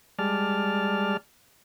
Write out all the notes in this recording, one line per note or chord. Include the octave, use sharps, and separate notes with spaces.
G3 G#3 D5 A5 F6